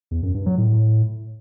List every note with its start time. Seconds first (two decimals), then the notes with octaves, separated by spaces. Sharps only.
0.11 E2
0.23 F#2
0.34 G2
0.46 F#3
0.58 A2